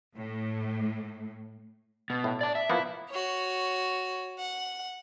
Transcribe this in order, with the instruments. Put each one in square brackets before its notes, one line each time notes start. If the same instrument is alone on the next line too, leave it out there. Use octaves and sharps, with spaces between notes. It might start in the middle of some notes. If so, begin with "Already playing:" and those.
[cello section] A2
[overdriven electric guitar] B2
[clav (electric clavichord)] A2
[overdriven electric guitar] D5 A5
E5
[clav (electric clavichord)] F3 A#3 B3 [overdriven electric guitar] E4
[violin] F#4 C#5
F#5